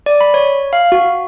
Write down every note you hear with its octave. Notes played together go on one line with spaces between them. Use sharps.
D5
B5
C#5
F5
F#4